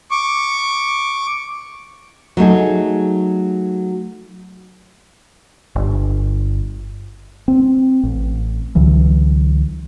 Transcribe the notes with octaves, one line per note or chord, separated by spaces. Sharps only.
C#6 D6
F#3 A3 D#4 G#4
G1
C4
A1
C#2 D3 E3 F#3